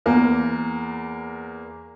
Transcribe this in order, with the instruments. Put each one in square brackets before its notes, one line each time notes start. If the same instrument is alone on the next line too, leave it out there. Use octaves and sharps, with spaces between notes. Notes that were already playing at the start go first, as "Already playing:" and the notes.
[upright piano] E2 A#3